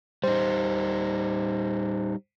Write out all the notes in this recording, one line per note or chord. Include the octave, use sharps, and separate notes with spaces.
G3 D#4 C5